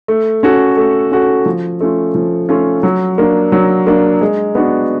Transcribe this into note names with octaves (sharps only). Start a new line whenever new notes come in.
A3
C#4 F#4 A4
A3
C#4 F#4 A4
F3
A3 C#4 F4
F3
A3 C#4 F4
F#3
A#3 D4
F#3
A#3 D4
G#3
B3 D4 F#4